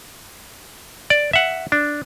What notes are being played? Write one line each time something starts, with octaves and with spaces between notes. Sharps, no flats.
D5
E5 F#5
D4